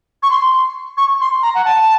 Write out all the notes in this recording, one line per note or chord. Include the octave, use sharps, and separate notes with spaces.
C#6
C6
C#6
C6
A#5
F#5
A5